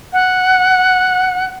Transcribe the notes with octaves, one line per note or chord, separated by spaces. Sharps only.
F#5